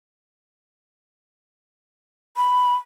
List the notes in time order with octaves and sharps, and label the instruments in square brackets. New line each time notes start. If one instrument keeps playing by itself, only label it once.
[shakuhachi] B5